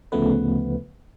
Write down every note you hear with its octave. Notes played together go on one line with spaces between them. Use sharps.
D2 C#3 F3 A3 B3 B4